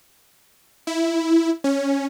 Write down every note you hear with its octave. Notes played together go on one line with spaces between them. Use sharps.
E4
C#4